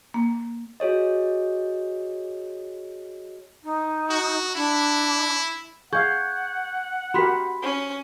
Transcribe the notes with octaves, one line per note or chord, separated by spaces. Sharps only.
A#3
F#4 G#4 C#5 D#5
D#4
F#4
D4 E4
G#4 F5 F#5 C#6 G6 G#6
F#4 G4 A#4 B5 C6 B6
C#4